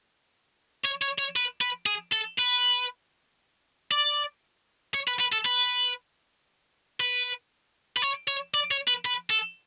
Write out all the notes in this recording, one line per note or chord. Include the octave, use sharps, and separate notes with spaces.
C#5
C#5
C#5
B4
B4
G#4
A4
B4
D5
C#5
B4
B4
A4
B4
B4
B4
C#5
C#5
D5
C#5
B4
B4
A4